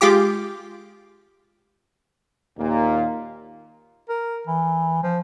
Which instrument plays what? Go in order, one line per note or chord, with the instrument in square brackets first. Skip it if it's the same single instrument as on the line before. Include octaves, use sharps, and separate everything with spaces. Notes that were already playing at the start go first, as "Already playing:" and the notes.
[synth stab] G#3 F4 G4 D6
[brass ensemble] D#2 A#2 A#3
[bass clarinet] A#4
E3
F3